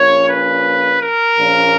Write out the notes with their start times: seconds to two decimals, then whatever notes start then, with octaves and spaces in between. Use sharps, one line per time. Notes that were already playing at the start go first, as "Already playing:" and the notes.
Already playing: A#1 A#2 A#3 C#4 C#5
0.27 B4
1.00 A#4
1.38 A#1 A#2 A#3 C#4